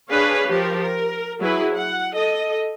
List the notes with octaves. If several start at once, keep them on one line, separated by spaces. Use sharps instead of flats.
D4 G#4 B4 C#5 F5
F3 G4 A#4
A#4
F#3 E4 G#4 B4
F#5
A4 D#5